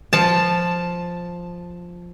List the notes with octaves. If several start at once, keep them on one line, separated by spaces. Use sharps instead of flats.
F3 A5